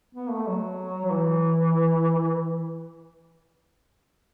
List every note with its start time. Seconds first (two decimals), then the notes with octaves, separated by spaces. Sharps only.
0.15 B3
0.31 A3
0.47 F#3
1.06 F#3
1.10 E3